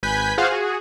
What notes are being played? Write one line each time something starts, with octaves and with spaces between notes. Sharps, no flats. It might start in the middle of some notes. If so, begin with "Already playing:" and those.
G#1 B4 G#5 B5 G6 B6
F4 F#4 G#4 C5 F5 F#5
F#4 G#4